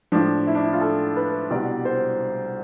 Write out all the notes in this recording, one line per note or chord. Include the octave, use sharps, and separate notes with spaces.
A2 F3 D4
E4
D4
E4
F4
A4
B4
C2 B2 G3 D5
C5